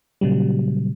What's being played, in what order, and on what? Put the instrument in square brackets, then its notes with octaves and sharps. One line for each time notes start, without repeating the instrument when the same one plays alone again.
[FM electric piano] A#2 C#3 F#3 G3